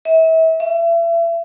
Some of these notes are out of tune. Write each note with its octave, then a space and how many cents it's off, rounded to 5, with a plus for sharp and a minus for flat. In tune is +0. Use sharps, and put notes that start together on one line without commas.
E5 -35
E5 +35